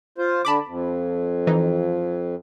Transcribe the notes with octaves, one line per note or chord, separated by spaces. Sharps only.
F4 C5
D3 A5 B5 D6
F2
E3 D#4